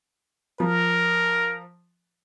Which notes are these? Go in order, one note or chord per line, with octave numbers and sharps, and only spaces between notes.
F3 A#4